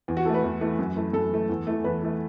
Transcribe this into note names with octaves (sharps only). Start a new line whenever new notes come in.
E2
F#4
E3 A3 A4
B4
E2
E3 A3
F#2
E3 A3
F#2 A4
E3 A3
E2
E3 A3
E2 B4
E3 A3